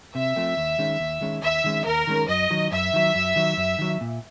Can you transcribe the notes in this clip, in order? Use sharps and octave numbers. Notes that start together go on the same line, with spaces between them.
C3 E5
F3 A3 C4
D#2
D#3 G#3 C#4
D#2
D#3 G#3 C#4
D#2 E5
D#3 G#3 C#4
D#2 A#4
D#3 G#3 C#4
F#2 D#5
D#3 F#3
F#2 E5
D#3 F#3
F#2
D#3 F#3
F#2
D#3 F#3
A#2